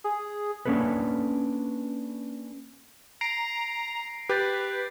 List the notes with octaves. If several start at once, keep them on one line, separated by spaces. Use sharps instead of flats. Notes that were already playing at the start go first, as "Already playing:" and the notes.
G#4
A#3 C#4 D4 A4 B4
A#5 A#6 C7 D7
G4 B4 F#6 G6 A6